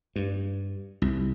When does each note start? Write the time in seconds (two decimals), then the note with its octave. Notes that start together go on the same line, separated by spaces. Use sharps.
0.16 G2
1.02 C2